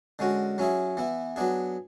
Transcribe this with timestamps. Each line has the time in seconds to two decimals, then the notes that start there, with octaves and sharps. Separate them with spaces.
0.19 D3 G#3 C#4 F#4
0.58 F#3 C#4 E4 G#4
0.97 E3 B3 E4
1.36 F#3 B3 D4 G#4